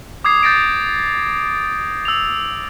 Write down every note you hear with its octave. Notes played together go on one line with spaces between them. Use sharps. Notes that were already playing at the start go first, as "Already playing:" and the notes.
D6 D#6 G#6 C7
G6 A6 A#6 D7
E6 F7